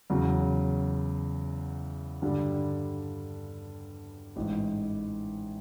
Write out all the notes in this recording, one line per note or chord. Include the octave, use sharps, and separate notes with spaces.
E2 C#3 F#3
G2 D3 G3
A1 G#2 E3